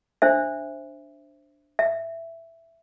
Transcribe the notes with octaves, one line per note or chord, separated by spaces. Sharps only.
D4 C5 E5
E5